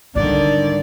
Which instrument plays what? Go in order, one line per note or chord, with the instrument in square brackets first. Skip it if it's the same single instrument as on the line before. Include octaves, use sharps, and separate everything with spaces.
[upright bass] G#2 G3 [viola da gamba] D3 D#3 [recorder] D5